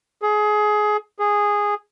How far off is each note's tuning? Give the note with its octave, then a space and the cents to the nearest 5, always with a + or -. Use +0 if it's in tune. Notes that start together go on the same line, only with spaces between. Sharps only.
G#4 +20
G#4 -10